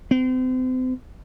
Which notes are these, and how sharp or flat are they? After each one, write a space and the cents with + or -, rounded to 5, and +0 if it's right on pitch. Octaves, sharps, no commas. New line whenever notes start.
C4 -35